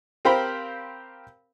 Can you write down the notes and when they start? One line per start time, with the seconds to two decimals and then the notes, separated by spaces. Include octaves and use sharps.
0.25 C4 G4 A#4 C5 F5 B5